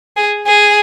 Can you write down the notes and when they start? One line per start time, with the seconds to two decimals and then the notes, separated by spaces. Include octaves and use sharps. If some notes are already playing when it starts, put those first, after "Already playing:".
0.17 G#4
0.47 G#4